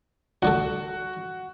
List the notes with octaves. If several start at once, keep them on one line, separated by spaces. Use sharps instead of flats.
D2 G3 F#4 A4